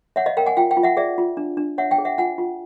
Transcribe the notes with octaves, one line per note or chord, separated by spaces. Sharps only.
C#5 E5 F#5
D#5 F5
A#4 F5 G5
F#5 G#5
F4 F5 G5
F5 G5
F4
E5 F#5
G#4 D5 E5
F4
D4
D4
C#5 E5 F#5
F5 G5
G#4
E5 F#5
F4 F#5 G#5
F4